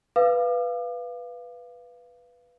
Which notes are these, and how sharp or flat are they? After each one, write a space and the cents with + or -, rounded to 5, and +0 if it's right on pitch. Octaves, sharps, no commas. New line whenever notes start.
B4 +0 F5 -15 D6 +40